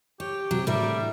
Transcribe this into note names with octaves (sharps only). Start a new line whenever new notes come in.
G4 C#5
C3 F#3
A2 D3 G3 A#4 E5